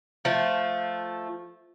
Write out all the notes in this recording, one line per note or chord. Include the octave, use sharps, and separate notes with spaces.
F3 A3